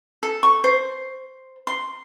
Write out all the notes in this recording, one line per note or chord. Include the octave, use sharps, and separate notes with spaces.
A4
C#6
C5
C6